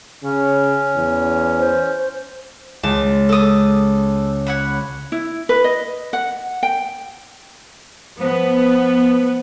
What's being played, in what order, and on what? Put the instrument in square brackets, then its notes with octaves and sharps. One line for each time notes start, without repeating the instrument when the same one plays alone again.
[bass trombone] C#3 [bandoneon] C#4
[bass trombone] E2
[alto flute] C5
[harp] C#2 [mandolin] A5
[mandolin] A4 D#6
C#5 F#5 B5
[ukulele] E4
B4
D#5
F#5
G5
[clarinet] F3 [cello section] B3